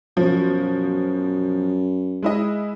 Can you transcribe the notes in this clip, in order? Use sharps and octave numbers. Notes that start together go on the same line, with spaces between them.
F#2 B2 F3
G#3 E4 D#5